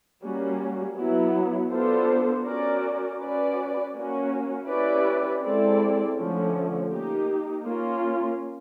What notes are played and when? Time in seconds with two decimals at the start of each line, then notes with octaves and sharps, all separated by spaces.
0.22 G3 A#3 C#4 F#4
0.96 F#3 B3 E4
1.71 B3 D4 F4 A4 C5
2.45 C#4 F#4 A#4 D5
3.20 C#4 F#4 B4 D5
3.94 A#3 C#4 F#4
4.68 C#4 E4 G4 B4 D5
5.43 G#3 C4 E4 A4 D5
6.18 D3 F3 A3 C#4
6.92 A#3 D#4 G4
7.67 A#3 C#4 F4